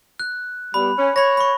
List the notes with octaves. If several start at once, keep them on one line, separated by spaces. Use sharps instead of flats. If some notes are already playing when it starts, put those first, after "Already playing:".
F#6
G3 B3 B5
C#4
C#5 B5 A#6
B5 C#6